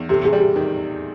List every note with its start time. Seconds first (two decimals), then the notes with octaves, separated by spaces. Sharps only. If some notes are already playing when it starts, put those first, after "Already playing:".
Already playing: E2 D#3
0.09 C3 G4 A4
0.25 G#4
0.33 G3
0.40 G4
0.56 D#3